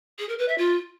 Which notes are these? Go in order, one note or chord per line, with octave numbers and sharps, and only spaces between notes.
G#4
A#4
B4
E5
F4